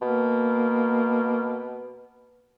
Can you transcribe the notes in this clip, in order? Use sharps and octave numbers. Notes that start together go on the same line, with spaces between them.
B2 A#3